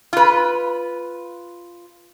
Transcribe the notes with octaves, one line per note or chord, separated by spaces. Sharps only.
F4 B4